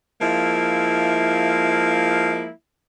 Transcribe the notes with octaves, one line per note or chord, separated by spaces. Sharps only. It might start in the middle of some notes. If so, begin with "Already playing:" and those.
F3 G#3 A#3 E4